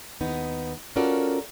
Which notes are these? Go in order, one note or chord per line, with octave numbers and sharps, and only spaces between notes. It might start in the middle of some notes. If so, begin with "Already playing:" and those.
D#2 B3 D#4
C#4 F4 F#4 A4 A#4 D5